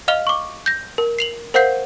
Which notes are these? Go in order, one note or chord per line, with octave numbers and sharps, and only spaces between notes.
D#5 F5 F6 F7 G7
C#6 D6
G6 A#6
A#4
C7 F7 F#7
A#4 C5 F5 F#5 G6 C7